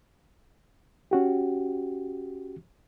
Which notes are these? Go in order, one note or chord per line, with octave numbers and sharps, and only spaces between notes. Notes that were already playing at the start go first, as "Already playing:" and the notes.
C#4 F#4 G4